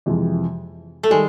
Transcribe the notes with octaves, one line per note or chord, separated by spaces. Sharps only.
F2 C3 E3 G#3
A3
D#3 G3 G#3